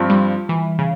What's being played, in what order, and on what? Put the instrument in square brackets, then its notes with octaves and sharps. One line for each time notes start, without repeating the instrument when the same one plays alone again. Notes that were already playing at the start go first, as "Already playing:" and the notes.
Already playing: [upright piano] G2 F3 C4
[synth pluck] G3
E3
C#3